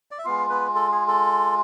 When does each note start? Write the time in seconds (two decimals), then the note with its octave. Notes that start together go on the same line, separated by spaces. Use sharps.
0.11 D5
0.18 E5
0.24 G#3 B3 F4 F5
0.50 B3 B4
0.75 A4
0.92 G#4
1.08 A4